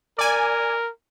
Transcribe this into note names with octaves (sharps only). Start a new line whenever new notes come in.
A#4 D5 G#5